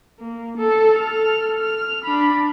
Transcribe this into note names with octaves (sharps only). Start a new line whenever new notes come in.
A#3
A4
A4 F6
F6
D4 B5